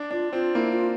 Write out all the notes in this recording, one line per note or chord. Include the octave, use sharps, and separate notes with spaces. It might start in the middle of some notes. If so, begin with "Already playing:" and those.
Already playing: D4
D4 F4
C4 F4
A#3 E4
F4